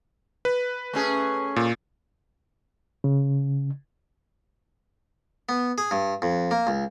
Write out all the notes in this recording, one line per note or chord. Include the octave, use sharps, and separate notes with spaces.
B4
A3 C#4 G#4
A#2
C#3
B3
G#4
G2
F2
A#3
C#2